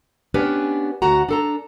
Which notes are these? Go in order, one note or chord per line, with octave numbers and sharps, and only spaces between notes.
B3 C#4 D4 G4 B4
D2 F#4 F#5 A#5
D4 A4 A#5